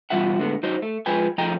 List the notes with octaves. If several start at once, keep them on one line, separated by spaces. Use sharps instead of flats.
B2 E3 G3 F4 E5 F#5
A2 D3 G#3 B3
F#3 D#4 C5 D#5
A3
F3 G#3 B4 G5 G#5
F3 A3 G#4 D#5 G5 A#5